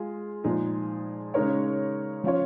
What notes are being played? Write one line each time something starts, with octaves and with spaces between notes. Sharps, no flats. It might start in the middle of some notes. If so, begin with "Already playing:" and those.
Already playing: G#3 F4 G#4
A#2 F3 G#3 D#4 G#4
C#3 G#3 D#4 A#4 C#5
F3 C#4 F4 C#5